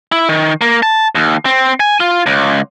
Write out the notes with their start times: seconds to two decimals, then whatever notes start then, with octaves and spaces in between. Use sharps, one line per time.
0.12 E4
0.29 D#3
0.61 A#3
0.83 A5
1.15 D#2
1.46 C4
1.80 G#5
2.00 F4
2.26 C#2